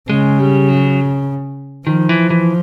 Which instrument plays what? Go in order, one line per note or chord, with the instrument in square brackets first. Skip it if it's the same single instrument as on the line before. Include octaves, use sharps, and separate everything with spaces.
[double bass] C#3 [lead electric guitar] G#3
[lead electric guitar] G3
F#3
[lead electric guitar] D#3 [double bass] F3
[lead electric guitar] E3
E3